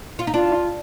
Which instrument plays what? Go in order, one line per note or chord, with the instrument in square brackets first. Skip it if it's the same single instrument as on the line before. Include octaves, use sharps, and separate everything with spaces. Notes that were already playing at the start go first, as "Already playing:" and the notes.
[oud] F4
D#4
[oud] D4 [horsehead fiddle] F4